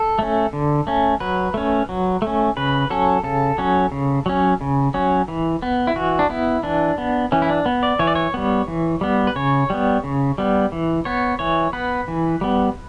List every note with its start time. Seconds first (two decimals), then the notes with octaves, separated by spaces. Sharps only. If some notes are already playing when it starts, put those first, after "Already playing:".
Already playing: A4
0.19 A3 C#4
0.53 D3
0.87 A3 C#4
1.20 F#3 B4
1.54 A3 C#4
1.89 F#3
2.22 A3 C#4
2.57 C#3 B4
2.90 F#3 C#4 A4
3.24 C#3 A4
3.58 F#3 C#4
3.92 C#3
4.26 F#3 C#4
4.61 C#3
4.94 F#3 C#4
5.28 E3
5.62 B3
5.87 E4
5.96 E3 F#4
6.19 D4
6.29 B3 E4
6.63 E3 D4
6.98 B3
7.32 E3 C#4
7.42 E4
7.49 D4
7.66 B3
7.83 D5
7.99 E3 C#5
8.07 D5
8.15 C#5
8.34 G3 B3
8.68 E3
9.01 G3 B3
9.27 B4
9.36 C#3 C#5
9.70 G3 B3
10.04 C#3
10.38 G3 B3
10.72 E3
11.05 B3 C#5
11.39 E3 C#5
11.73 B3 B4
12.08 E3
12.41 G3 B3